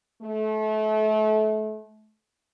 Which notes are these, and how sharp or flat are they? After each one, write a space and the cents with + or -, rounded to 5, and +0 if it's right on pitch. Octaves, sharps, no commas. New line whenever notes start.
A3 -30